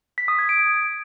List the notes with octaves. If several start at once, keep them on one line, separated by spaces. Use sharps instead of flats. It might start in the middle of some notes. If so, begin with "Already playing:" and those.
B6
D#6
G#6
D7